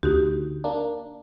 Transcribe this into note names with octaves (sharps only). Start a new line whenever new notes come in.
D2 D#4 F#4 G4
A#3 D4